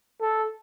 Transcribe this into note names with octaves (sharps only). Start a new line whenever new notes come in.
A4